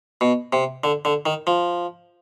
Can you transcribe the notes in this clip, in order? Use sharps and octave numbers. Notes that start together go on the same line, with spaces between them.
B2
C3
D3
D3
D#3
F3